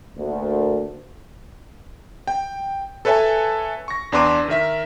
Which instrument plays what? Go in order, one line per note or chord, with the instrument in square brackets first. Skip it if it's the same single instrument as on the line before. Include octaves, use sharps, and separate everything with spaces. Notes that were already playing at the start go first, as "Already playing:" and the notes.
[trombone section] D2 A#3
[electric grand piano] G5
A4 B4 C#5 E5 G#5 A5
C#6 A#6
E2 D4 B4 C6 D6 D#7
D#3 A#4 E5 B6